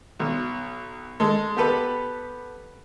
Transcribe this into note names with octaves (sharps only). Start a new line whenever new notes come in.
B1
G#3 A4
B3 G4 A4 B4